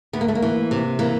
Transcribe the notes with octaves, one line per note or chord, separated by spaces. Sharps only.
D2 B3
A#3
A3
A#3
E3
C3
E3 A#3